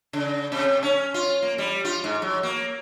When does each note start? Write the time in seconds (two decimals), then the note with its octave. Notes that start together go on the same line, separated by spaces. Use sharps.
0.13 C#3
0.52 C3
0.83 C#4
1.14 F4
1.42 A#3
1.58 G3
1.85 F4
2.04 G#2
2.22 F#3
2.43 A#3